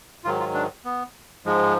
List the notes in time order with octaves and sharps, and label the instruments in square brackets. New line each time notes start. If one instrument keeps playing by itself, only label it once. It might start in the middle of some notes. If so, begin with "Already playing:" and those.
[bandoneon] G#2 D#3 F#3 F4
F4
D4
B3
G#2 F3 G#3